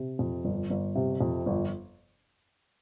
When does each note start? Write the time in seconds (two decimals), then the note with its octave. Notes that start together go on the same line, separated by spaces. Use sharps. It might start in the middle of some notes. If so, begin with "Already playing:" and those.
Already playing: C3
0.19 F2
0.45 G1
0.70 G1
0.95 C3
1.21 F2
1.46 G1